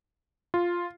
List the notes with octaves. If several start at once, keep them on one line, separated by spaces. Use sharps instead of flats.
F4